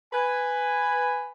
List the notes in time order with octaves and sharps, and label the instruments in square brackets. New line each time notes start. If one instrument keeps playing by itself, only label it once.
[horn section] B4 G#5